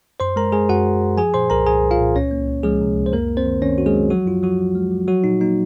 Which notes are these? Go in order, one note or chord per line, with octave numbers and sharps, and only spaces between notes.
F#2 C5 C6
G#3 A#4 A#5
G#3 G#4 G#5
F#2 F#4 F#5
F#2
F#2
F3 G#4 G#5
A#2 C5 C6
C2 A#4 A#5
C2 G#4 G#5
C2
F4 F5
A#2
C#2 C#4 C#5
A#3
C#2
F3 G#3 G#4
C3
C#2
C5
F#2 A#3 A#4
A#3
C4 C5
D#3
D#3 C#4 C#5
D#3 F#4
G#3 G#4
F#3
F3 F#3 F#4
F#2 F4
F3 F#3 F#4
F3
G#3
F3
F#3 F#4
A#2 D#4
A#3 D#4